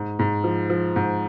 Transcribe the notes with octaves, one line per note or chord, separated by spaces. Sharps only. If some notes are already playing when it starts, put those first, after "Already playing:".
Already playing: G#2
G#2
F3
F3
G#2